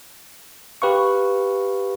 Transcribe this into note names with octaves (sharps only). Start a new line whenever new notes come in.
G4 B4 F5 C#6